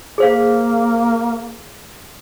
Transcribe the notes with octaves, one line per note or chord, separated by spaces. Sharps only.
A#3 G#4 C5 F5